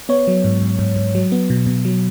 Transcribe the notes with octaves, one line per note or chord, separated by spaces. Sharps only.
B3 C#5
F#3
G#2
G#2
G#2
G#2
F#3
B3
B2
B2
F#3